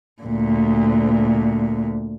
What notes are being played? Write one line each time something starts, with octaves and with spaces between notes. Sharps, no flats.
D2 A#2